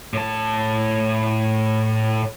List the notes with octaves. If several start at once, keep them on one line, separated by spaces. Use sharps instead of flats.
A2 A5